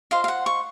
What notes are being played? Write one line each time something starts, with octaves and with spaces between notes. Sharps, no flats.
F4 C5 D#5 F5
F5
F#5
C#6